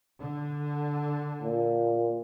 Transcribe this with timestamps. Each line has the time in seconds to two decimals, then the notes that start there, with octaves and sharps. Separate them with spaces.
0.20 D3
1.42 A#2